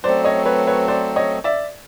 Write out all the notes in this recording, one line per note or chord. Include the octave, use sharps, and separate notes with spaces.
F#3 A3 C4 C5 D5
C#5 D#5
B4 C#5
B4 C#5
C5 D5
C#5 D#5
D5 E5